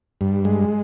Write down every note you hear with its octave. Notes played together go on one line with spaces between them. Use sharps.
G2
G#3